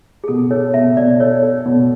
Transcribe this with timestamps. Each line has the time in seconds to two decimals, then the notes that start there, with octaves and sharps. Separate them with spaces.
0.24 G#4
0.28 B2 A4
0.51 A4 C#5
0.74 B2 E5
0.97 B2 D5
1.20 A4 C#5
1.43 A4
1.66 B2